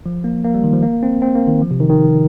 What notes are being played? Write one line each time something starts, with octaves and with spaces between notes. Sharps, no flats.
F3
A#3
A#3
G3
D#3
F3
A#3
C4
C4
A#3
D#3
F3
C3
D#3
D#3